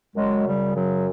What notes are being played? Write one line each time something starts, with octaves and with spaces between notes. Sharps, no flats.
F#2 F#3 G#3
C#3 G3
F#2 F#3